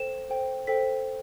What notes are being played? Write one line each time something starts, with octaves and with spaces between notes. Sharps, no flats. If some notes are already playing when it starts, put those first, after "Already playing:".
Already playing: A4 C5 G5 E7
A4 C5 G5
A4 C5 G5 B6